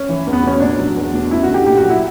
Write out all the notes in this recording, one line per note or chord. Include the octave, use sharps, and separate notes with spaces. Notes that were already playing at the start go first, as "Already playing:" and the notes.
Already playing: C#4
E3
E2
B3
B2 C#4
A#2 D4
F#3
E2
B2
F#2 E4
D3 F#4
G4
A#2 G4
F#4
F#3
E4